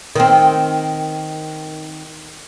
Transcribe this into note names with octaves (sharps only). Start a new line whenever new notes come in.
D#3 C4